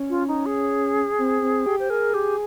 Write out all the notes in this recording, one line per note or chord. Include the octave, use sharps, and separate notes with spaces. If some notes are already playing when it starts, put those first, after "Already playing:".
Already playing: C#4
F4
D#4
G#4
C4
C4
G4
C5
G#4 A#4
G4